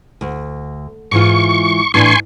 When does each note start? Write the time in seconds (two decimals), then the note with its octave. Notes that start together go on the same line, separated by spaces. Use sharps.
0.21 D2
1.12 G#2 E3 F4 C#6
1.94 A2 E3 D4 G#5 C6 C#6